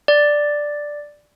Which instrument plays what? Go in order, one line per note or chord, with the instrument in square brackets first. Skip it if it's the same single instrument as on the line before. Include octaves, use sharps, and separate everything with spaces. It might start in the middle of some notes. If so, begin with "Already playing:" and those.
[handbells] D5